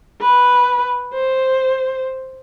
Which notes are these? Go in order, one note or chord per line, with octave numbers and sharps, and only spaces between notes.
B4
C5